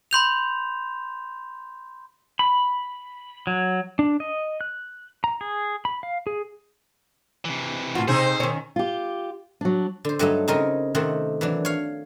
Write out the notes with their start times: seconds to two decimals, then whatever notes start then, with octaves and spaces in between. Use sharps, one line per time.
0.11 B5 C6 G6 F7
2.39 B5
3.47 F#3
3.99 D4
4.20 D#5
4.61 F#6
5.24 A#5
5.41 G#4
5.85 B5
6.03 F5
6.27 G#4
7.45 C3 E3
7.95 A2 F4 F#4
8.08 C3 C4 D#4 G#4 C5
8.40 D#3 C#4
8.76 F4 G4
9.61 F#3 D4
10.05 D3 C5
10.19 G2 F#3 A3 D#4 A4
10.48 C#3 C4 D#4 A#4 C#5 D#5
10.95 C3 D#3 A3 C4 F#5
11.41 E3 F#3 D4
11.65 C#5 F5